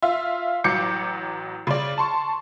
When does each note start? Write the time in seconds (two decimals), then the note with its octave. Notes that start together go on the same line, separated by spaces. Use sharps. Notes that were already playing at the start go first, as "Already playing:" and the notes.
0.02 F4 E5
0.64 A1 F#3 D6 G6 C#7
1.67 C#3 D5
1.98 A5 C6 C#6